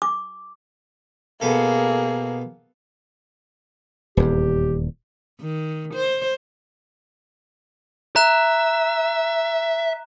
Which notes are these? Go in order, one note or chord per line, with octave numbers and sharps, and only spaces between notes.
D6
B2 A#3 B3 G#4 A4
D#1 E2 G4
D#3
C5
E5 A#5 F#6 E7